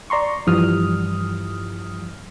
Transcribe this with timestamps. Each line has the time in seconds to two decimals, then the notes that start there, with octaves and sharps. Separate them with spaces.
0.10 D5 A#5 C6 C#6
0.47 G2 E3 F3 G3 D#6 F6